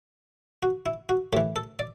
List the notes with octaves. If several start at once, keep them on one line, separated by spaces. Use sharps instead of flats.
F#4
E4
F#4
A2 E3 G4
A4
D5